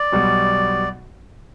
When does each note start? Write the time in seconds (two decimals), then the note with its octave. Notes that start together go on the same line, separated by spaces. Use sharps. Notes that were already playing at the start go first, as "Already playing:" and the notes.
Already playing: D5
0.12 B1 B2 G3